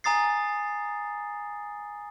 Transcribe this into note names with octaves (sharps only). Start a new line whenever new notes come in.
G#5 A#5 D#6 A6 C7